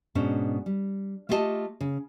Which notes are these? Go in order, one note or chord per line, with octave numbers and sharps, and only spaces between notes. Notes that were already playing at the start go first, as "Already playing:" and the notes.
G#2 B2 C#4 D4
G3
A3 F4 G4 A4 D#5 A5
C#3